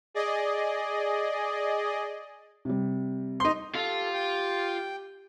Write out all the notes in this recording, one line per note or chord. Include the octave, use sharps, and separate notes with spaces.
G#4 D5 D#5
C3 G3
D#4 C6
F4 G4 A4 F5
G5